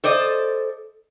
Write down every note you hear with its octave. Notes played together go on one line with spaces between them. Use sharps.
A4 C5 D5 D#5